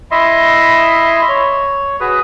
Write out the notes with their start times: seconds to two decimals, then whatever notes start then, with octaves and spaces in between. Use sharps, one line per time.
0.11 E4 D#5 E5 C6
1.29 C#5
2.01 F#4 G#4 B4